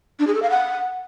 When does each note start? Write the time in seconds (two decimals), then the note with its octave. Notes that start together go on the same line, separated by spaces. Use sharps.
0.20 D4
0.27 G#4
0.35 A4
0.42 F5
0.50 F#5